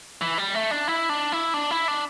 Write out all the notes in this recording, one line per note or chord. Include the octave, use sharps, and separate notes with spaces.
E3
G3
A3
D4
E4
D4
E4
D4
E4
D4